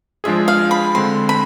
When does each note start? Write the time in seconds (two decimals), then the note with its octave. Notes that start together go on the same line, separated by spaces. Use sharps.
0.24 F3 G#3 D4 F4 G#4 E5
0.48 F5
0.71 B5
0.95 D3 G#3 C4 C6
1.29 B5